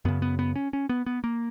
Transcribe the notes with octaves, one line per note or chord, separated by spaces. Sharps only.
F#2 C#3 B3
B3
B3
C#4
C#4
B3
B3
A#3